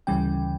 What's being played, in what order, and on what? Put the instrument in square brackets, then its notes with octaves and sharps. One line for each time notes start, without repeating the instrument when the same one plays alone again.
[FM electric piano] D2 C#3 E3 G3 C#4 G5